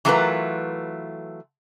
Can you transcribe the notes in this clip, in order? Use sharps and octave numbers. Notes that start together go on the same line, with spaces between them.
E3 F#3 A3 F4 A#4 B4